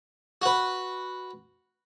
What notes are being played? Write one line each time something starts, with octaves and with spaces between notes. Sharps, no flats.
F#4 B4